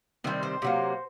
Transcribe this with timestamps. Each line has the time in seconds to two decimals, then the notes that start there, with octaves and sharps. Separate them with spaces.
0.24 C3 D#3 G3 C4
0.43 C5
0.62 C3 F#3 A#3